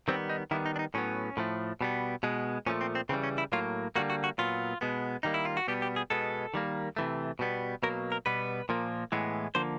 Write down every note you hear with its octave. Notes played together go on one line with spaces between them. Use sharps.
D#3 G3 B3 C4
D#4
D#3 G3 B3 E4
D#4
D4
D#4
A2 F#3 B3 C#4
A2 F3 A3
B2 G3 B3
B2 G#3 B3
A#2 F3 A3 C#4
C4
C4
C#3 E3 G3 C4
C#4
E4
A2 F#3 A#3 F4
D3 G3 A#3 F#4
F#4
F#4
A#2 F#3 B3 F4
B2 G#3 B3
D#3 G3 A#3 D#4
E4
F4
F#4
B2 G3 B3 G4
G4
G#4
B2 G#3 B3 A4
D#3 G3 A#3
C3 E3 A3
B2 G3 B3
B2 F#3 A#3 A#4
A#4
B2 G3 B3 B4
A#2 F3 A#3
A2 E3 G#3 B3
D3 F3 A#3 C5